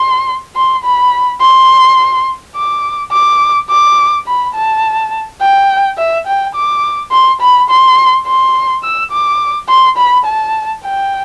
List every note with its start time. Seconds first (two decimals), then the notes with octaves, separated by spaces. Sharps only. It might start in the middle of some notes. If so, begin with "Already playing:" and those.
Already playing: C6
0.56 C6
0.84 B5
1.41 C6
2.56 D6
3.12 D6
3.70 D6
4.27 B5
4.55 A5
5.41 G5
5.98 E5
6.27 G5
6.55 D6
7.11 C6
7.41 B5
7.70 C6
8.27 C6
8.83 E6
9.11 D6
9.69 C6
9.97 B5
10.25 A5
10.84 G5